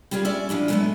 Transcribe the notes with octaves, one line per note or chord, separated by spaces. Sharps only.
G3 F4 G4 G#4 D5
C#4 D5 E5
E2 F3 D4 E4
F#3 G#3 A3 B3 A4 E5